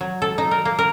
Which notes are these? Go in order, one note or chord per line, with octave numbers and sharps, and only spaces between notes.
F#3
A4
D#4
A#4
A#3
A#4